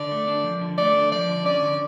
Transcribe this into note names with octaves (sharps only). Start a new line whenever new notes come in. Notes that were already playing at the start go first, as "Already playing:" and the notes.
Already playing: D3 D5
A3
D4
F3
D3
A3 D5
D4
F3 D5
D3
C#4 D5
D3